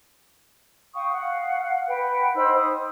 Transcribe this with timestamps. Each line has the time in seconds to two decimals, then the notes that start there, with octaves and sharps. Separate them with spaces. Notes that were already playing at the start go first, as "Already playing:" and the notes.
0.93 F5 G5 C#6 D#6
1.12 F5 F#5
1.87 B4 F#5 G5
2.34 D#4 C5 B5 E6
2.54 D#6